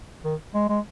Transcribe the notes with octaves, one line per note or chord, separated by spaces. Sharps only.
D#3
G#3
G#3